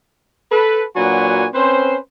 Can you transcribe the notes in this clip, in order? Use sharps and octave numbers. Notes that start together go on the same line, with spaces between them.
A4 B4
A#2 F#3 D4 F#4 B4 G#5
C4 C#4 B4 C5